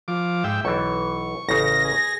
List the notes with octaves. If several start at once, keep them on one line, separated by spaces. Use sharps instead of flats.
F3 D6
G#2 E5 G5
B1 E3 C#6
A1 C#3 A#6
G#4